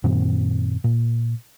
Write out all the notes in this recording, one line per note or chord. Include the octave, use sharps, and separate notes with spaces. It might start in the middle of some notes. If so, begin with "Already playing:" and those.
F#2 A#2 D#3 C4
A#2